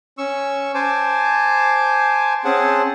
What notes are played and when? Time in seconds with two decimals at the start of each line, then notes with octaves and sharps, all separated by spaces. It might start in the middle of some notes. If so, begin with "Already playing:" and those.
0.18 C#4 C#6 E6
0.74 C5 G#5 A5 D6
2.45 C4 C#4 G#4 F#5 A5